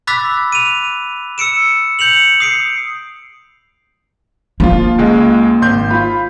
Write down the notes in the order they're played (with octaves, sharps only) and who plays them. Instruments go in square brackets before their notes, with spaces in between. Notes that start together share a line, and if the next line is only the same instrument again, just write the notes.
[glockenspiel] B5 D6 E6 F#6 A6 B6
D#7 F7
E6 C#7 D7 E7
G6 C#7 F7 F#7
D#6 C7 D7
[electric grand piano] F3 F4 [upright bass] A#3
[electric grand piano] C#2 G#3
G#1 C6 G6
F4 B5